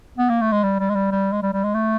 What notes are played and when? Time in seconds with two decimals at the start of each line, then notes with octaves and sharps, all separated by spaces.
0.18 B3
0.29 A#3
0.41 A3
0.52 G#3
0.64 G3
0.79 G3
0.89 G#3
0.95 G3
1.11 G3
1.32 G#3
1.42 G3
1.53 G3
1.64 G#3
1.74 A3